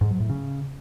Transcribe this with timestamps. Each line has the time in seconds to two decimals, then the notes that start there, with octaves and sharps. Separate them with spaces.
0.01 G#2
0.11 F#3
0.20 A2
0.30 C#3